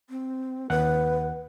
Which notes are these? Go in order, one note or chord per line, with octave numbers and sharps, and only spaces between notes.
C4
D#2 B4 F#5